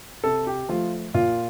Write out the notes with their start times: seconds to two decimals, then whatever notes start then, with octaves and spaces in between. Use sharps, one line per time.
0.24 C3 A4
0.47 G4
0.69 F3 A3 F4
1.14 A#2 F4